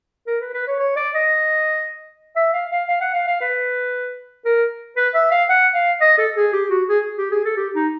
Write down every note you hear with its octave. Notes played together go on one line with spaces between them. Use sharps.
A#4
B4
B4
C#5
C#5
D5
D#5
E5
F5
F5
F5
F#5
F5
F5
B4
A#4
B4
E5
F5
F#5
F5
D#5
A4
G#4
G4
F#4
G#4
G4
G#4
A4
G4
D#4